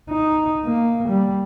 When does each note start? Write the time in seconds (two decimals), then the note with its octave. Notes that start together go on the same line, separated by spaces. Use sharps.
0.10 D#4
0.65 A#3
1.09 G3